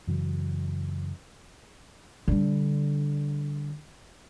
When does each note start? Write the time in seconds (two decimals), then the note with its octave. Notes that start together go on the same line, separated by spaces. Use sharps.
0.07 F#2 C#3 E3 F#3
2.28 D3 G3